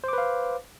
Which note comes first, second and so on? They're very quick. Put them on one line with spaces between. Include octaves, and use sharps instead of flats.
C5 D6 B4 F5